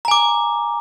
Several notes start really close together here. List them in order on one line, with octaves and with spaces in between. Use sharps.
A#5 G#5 D6